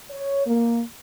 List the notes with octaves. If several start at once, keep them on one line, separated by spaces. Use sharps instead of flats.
C#5
A#3